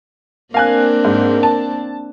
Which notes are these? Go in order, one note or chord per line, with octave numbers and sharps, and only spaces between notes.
A#3 C4 D4 A#4 F5 G#5 F#6
G#2
A5